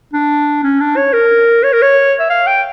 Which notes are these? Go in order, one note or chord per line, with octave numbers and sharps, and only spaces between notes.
D4
C#4
D4
C#5
A#4
C#5
A#4
C#5
E5
F5
G5